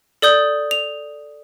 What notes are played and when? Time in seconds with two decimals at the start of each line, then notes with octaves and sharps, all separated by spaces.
0.22 A4 D5 D#6 G6 G7
0.71 F7